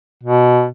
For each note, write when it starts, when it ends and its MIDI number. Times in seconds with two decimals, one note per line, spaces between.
0.23 0.67 47